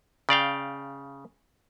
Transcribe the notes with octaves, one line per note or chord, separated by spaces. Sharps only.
C#3 D5 F5 G5